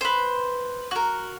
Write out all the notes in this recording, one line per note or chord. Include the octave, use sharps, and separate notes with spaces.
B4 C5
F#4 A#4